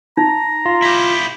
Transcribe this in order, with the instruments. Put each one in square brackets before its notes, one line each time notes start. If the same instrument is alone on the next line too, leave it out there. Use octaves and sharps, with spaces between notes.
[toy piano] D#4 [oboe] A#5
[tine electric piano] F4
[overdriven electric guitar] E4 G4